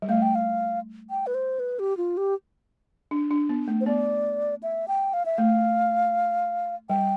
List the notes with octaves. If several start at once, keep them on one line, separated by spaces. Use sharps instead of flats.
G3
A3 F5
G5
F5
G5
B4
C5
B4
G4
F4
G4
D4
D4
B3
A3
C5
B3 D5
E5
G5
F5
E5
A3 F5
G3 G5